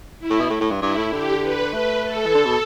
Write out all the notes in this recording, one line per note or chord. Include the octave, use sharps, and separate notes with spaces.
E4
A2
B2
A2
A2
G2
G2 E4
A2
D3 G4
B4
A3 B4
A4
E3
D3
B2